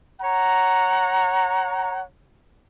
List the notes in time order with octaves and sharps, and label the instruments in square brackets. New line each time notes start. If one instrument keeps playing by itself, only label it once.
[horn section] C#5 F#5 A#5